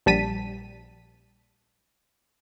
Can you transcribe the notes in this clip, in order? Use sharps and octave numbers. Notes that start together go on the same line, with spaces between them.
A#1 G3 A5 B6 D#7